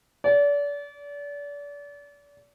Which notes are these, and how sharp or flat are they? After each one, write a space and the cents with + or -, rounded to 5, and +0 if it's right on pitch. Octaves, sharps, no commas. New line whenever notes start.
D5 -35